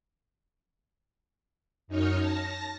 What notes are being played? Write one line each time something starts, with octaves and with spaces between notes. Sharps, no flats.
F#2 D#4 C#5 F6
A5 A#6